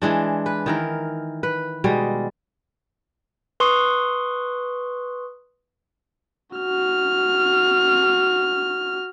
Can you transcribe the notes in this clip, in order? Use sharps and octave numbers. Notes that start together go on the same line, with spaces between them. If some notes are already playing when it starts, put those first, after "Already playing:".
E3 G#3 D4
B4
D#3 E3 A#4
B4
B2 G3 G#3
B4 C6 C#6 D#6
F#4 F6